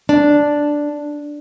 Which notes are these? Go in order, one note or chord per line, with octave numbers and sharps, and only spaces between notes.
D4